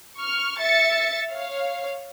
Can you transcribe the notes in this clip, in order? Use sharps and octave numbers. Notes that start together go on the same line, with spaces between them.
C#6 F6
E5 A6 C#7
C#5 F5